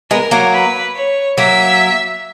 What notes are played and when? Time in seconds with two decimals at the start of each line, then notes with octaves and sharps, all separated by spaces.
0.11 G#3 B3 A#4
0.31 F#3 A#3
0.53 B4
0.95 C#5
1.38 F#3 A#3 E5